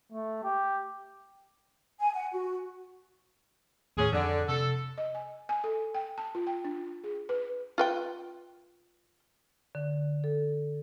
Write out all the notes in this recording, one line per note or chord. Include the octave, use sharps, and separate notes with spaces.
A3
G4
G#5
F#5
F#4
D#2 A2 C#4 G#4
F2 D3
C3 A4
D#5
G#5
G#5
A4
G5
A5
F4
G5
D4
G#4
B4
F4 B4 G5
D3
A4